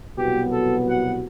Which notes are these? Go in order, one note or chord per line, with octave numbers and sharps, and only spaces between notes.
C2 B2 F#3 B3 G4
A4
F#5